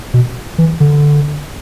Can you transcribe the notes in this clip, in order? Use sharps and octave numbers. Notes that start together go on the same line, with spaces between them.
B2
E3
D3